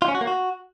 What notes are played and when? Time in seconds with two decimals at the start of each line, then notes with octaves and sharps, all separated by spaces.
0.02 F4
0.08 C#4
0.15 F#4
0.21 A#3
0.27 F#4